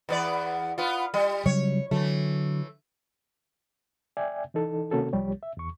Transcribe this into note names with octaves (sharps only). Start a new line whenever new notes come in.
E2 B3 D5
B3 F4
G3
C#3 F#3 G3 C#5
D3 E3 F#3 A3
D5 E5 G5 G#5
E3 D#4 A4
C3 D#3 A#3 C#4 F#4 A4
C2 F3 G3 G4 C#5
E5
E2 C#6